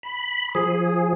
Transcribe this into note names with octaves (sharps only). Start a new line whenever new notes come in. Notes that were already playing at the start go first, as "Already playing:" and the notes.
B5
F3 G#4